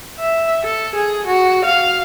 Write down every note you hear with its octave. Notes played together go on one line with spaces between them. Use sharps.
E5
A4
G#4
F#4
F5